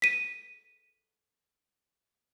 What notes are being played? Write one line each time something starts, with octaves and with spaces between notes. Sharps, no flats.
B6 D#7